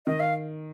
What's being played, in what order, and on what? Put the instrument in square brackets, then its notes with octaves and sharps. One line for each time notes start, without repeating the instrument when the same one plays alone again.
[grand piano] D#3 [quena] D#5
[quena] F5